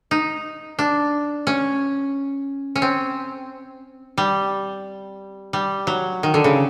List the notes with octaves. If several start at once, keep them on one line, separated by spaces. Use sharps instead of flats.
D#4
D4
C#4
C#4
C4
G3
G3
F#3
D#3
D3
C#3